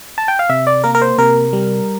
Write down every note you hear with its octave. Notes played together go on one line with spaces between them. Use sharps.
A5
G5
F5
C3 E5
D5
A#3 A#4
A#4
C5
C3 A#4
G3